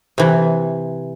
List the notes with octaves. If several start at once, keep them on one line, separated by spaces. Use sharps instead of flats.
C3 E3